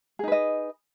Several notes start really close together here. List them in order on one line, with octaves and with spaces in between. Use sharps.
G#4 D#4 B4 D#5